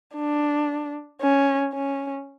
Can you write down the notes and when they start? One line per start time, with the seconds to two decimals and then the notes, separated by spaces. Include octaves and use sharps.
0.15 D4
1.21 C#4
1.74 C#4